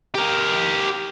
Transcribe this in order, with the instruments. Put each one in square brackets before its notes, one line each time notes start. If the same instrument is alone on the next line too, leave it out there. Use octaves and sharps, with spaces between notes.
[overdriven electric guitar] G4 A#4